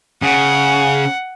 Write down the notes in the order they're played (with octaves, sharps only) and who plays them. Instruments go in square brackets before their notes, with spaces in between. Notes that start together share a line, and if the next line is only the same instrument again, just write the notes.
[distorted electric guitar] C#3 [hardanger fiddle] F#5